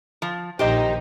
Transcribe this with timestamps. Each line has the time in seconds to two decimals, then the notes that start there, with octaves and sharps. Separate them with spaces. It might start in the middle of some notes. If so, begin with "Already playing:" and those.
0.22 F3
0.59 A#1 D#3 D#4 G4 C5 D#5